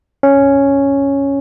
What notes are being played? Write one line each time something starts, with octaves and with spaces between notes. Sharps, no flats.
C#4